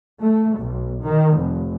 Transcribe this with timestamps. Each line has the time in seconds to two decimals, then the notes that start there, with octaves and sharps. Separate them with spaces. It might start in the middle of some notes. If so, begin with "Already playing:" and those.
0.22 A3
0.58 B1
1.03 D#3
1.40 F1